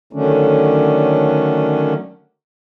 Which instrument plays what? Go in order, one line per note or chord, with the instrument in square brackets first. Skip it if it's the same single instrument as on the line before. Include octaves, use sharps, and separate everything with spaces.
[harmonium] D3 D#3 F#3 A3 C#4 D4